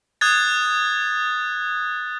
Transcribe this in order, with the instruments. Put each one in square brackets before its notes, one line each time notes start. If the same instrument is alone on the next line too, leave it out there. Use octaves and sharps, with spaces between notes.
[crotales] D#6 F#6 G#6 A6